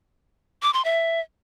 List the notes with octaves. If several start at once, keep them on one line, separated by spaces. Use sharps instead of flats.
D6
C6
E5